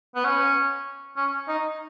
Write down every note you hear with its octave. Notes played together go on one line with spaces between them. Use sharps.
B3
C#4
C#4
D#4